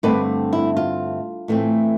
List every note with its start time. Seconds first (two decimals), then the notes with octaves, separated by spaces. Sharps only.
0.03 G2 D3 A3 C4 B4 D5
0.53 E4
0.77 F4
1.48 A2 E3 A3 C4